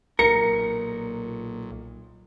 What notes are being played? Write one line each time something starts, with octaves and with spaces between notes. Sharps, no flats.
B1 A#2 A#4 C#7